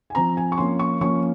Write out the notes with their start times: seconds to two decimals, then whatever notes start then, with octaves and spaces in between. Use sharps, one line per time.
0.10 G#5
0.15 F3 C4 A#5
0.37 G#5
0.52 C#6
0.58 F3 A#3 C#4 C6
0.79 C#6
1.01 F3 A#3 C#4 C#6